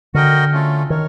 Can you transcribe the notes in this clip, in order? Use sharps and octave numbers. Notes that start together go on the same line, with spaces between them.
D3 F#4 A#4 D#5 G5
A3 C#4 F4 A4
D#3 A#4 C#5